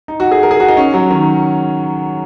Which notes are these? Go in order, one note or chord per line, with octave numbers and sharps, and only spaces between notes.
D#4
F#4
G#4
A#4
G#4
F#4
D#4
C#4
F#3
D#3